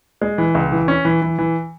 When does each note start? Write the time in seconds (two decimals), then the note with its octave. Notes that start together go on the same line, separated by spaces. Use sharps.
0.21 G#3
0.38 E3
0.55 C#2
0.72 E3
0.88 C#4
1.05 E3
1.22 E3
1.39 E3